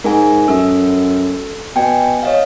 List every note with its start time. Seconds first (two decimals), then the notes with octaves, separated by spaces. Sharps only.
0.04 G#2 A#4 G#5
0.48 F#2 A4 E6
1.76 B2 G5 G#5
2.23 C#5 D#5 F5